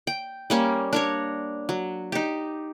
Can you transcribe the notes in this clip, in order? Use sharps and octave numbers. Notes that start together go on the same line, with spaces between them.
G5
G3 A#3 C#4
D4 A#4 C#5
F#3
D#4 G4